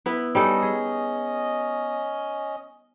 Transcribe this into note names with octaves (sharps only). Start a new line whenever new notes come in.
B3 E4
G3 C#4 D#4 A4 D#5
G#4